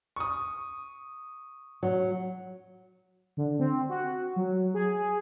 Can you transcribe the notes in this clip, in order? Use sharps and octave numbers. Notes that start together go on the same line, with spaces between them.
C#6 D#6
F#3
D3
C4
F#4
F#3
G#4